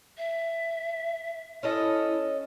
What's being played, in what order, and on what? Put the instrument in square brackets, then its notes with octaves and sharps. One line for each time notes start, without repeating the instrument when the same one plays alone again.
[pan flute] E5
[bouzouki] C#4 A4 D#5 [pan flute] E4